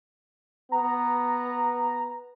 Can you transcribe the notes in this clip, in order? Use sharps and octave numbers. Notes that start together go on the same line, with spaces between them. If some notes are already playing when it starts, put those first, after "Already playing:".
B3 A#5